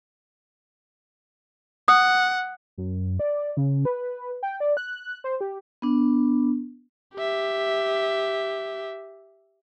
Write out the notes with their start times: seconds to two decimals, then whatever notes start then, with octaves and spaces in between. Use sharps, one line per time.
1.88 F#5 D#6
2.78 F#2
3.20 D5
3.57 C#3
3.85 B4
4.43 G5
4.60 D5
4.77 F#6
5.24 C5
5.41 G4
5.82 B3 D4
7.15 G4 E5